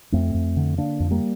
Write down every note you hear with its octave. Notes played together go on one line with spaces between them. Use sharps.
F2 A3 C4
F2
D3
D3 A#3 D4
F2
G3 A#3